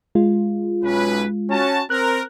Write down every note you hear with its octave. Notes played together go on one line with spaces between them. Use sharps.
G#3 F4
B1 C#4 B4
C#4 F#4 A5
C4 A#4 F#6